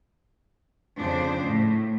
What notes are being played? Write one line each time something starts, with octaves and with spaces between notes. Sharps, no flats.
F2 C#3 D4 C5
A2